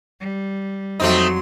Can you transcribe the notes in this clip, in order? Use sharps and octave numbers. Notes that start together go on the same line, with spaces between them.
G3
F2 F#3 A3 C4 D#4 C6